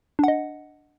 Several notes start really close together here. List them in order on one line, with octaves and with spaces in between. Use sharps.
D4 F#5 D#5